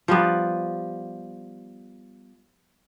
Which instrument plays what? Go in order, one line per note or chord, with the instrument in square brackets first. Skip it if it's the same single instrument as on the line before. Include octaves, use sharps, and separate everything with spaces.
[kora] F3 G3 B3